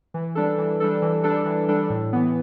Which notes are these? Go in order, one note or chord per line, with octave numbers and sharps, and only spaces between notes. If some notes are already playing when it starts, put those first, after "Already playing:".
E3
G3 D4 A4
E3
G3 D4 A4
E3
G3 D4 A4
E3
G3 D4 A4
A2
E3 B3